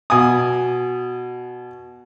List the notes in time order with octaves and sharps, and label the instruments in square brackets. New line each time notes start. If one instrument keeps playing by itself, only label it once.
[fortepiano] B2 G#5 D#6